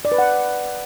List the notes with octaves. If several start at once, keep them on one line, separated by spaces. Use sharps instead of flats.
D5
B4
F#5